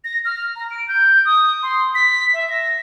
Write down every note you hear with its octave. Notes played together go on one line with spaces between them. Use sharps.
A#6
F6
A#5
D7
G6
D#6
C6
B6
E5
A#6